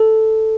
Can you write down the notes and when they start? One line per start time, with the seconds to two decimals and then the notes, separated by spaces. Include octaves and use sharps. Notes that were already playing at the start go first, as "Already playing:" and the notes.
Already playing: A4